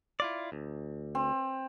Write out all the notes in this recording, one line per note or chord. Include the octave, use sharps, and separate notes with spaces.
E4 F4 D5
D2
C4